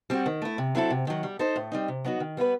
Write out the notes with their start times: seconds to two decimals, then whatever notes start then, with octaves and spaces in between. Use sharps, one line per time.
0.10 G3 C4 F#4
0.26 D#3
0.42 A3 E4
0.58 C3
0.75 F#3 C4 E4 A4
0.90 C3
1.07 D#3 F#3
1.23 G3
1.39 D#4 A4 C5
1.56 A2
1.72 G3 C4 D#4
1.88 C3
2.05 F#3 B3 D#4 F#4
2.20 D#3
2.37 G3 B3 E4 B4